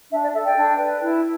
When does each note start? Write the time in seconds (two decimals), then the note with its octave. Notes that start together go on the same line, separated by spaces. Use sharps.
0.10 D4 E5
0.22 D5
0.34 A4 E5
0.45 D5 G5
0.56 D4
0.79 B4
1.01 E4